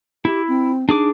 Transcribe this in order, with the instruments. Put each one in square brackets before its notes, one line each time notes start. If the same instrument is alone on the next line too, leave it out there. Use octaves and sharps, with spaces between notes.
[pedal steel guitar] E4 [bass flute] G4
[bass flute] C4
[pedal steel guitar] D4 G#4 D6 [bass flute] D#4